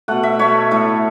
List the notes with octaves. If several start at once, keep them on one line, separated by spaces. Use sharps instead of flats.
B2 A3 F#5
E5
B2 A3 C#5
A2 A3